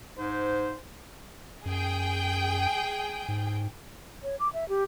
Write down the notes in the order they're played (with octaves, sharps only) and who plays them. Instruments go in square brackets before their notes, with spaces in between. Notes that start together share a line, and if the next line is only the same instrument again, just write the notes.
[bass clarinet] G#2 [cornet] C5
[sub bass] F#2 [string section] G#4 G5
[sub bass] G#2
[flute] C#5
D6
E5
G4